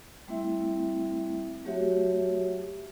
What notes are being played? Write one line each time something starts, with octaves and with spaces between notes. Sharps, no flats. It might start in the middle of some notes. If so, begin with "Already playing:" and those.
G3 A3 C4 E4 E5
F#3 A3 F#4 G4 C#5 E5